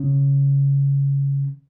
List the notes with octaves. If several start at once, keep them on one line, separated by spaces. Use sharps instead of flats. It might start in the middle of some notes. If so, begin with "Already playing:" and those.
Already playing: C#3